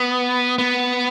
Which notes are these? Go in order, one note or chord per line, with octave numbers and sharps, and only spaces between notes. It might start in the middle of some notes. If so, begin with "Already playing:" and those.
Already playing: B3
B3